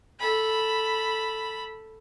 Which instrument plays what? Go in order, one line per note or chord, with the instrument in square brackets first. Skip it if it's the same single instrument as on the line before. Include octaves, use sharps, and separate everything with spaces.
[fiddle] A4 B5